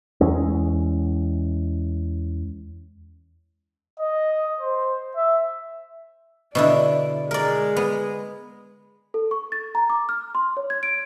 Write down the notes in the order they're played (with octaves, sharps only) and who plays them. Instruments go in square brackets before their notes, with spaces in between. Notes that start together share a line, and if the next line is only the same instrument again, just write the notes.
[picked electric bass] E2 E3 G#3 C#4
[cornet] D#5
C5
E5
[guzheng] B2 D3 E4 [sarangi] D5
[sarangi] G#3 [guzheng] A#4 D5
[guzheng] B3
[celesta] A4
C#6
A6
A#5
D6
F6
C6
C#5
G#6
D7